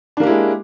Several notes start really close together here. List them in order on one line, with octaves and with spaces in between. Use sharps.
D4 A#3 G4 E4 G#3